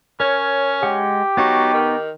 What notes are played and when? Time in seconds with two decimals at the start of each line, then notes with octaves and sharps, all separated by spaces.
0.20 C#4 A#4 C#5
0.83 G#3 G4 F#5
1.37 F#3 B3 D#4 C#6
1.74 D#3